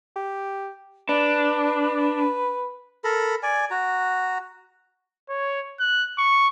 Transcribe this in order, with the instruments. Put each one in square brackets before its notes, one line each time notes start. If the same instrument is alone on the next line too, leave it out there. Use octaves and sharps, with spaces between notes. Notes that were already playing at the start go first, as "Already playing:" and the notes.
[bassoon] G4
[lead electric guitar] D4 [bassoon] B4
[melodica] A4 A#4 B5
D5 G#5
F#4 A#5
[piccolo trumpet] C#5
F#6
C#6